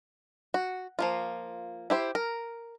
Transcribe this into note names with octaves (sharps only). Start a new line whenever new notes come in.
F#4
F3 A#3 F4
E4 G4 C5
A#4